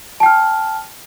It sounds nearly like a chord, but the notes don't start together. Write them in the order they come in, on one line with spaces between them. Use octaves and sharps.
A5 G5 F6